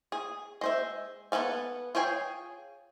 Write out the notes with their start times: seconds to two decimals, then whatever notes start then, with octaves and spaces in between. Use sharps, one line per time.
0.12 G#4
0.61 G#3 C5 E5
1.32 B3 A4 B4 F5 G#5
1.95 F4 G#4 C#5 G5 G#5